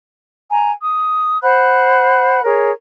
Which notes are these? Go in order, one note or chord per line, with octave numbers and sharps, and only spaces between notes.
G#5 A#5
D#6
C5 F#5 B5 F#6
G#4 A#4 C#5